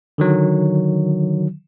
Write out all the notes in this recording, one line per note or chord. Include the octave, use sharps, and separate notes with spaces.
D3 D#3 F#3